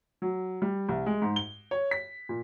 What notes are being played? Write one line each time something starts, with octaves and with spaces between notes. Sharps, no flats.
F#3
G3
C2
G#3
G#2
G7
C#5
B6
A#2